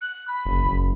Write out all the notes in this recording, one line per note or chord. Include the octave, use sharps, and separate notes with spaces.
F#6
B5
F#1
F#1